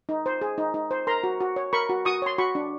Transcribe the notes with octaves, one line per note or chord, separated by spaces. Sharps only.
D#4
C5
G#4
D#4
D#4
C5
A#4 A#5 C6
F#4
F#4
C#5
A#4 B5 C#6
F#4
F#4 C#6 D#6
C#5 C6
F#4 B5 C#6
D4